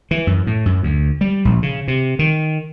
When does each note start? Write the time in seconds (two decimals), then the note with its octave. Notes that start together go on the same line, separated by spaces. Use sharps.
0.11 E3
0.27 F#2
0.47 A2
0.66 F#2
0.83 D2
1.21 G3
1.45 A#1
1.62 C#3
1.88 C3
2.19 D#3